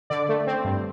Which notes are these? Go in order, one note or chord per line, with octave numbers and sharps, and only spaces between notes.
D3 D5
A3
C4
G2